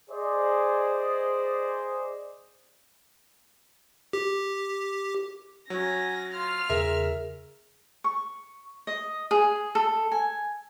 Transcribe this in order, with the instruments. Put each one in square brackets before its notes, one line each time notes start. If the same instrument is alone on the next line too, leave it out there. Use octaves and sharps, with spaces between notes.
[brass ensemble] G#4 C5 D5 D#5
[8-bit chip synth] G4
[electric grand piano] F#3 [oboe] C#4 [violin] A#6
[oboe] F4 [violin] F6
[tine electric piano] E2 C#3 G#4 [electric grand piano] A#4 E5
[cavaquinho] C#6
D#5
G#4
A4
G#5